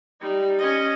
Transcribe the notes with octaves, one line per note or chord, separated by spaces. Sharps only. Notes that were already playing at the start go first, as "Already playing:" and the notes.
G3 D#4
C#4 D#5